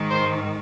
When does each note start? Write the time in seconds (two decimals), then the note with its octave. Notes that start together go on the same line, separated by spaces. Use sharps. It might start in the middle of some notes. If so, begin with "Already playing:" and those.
Already playing: G#2 D#3
0.09 C5